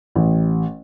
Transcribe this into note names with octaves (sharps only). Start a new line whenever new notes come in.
A1